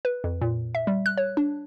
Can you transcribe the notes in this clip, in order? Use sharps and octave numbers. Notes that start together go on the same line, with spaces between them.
B4
F2
A#2
E5
G3
F#6
C#5
D4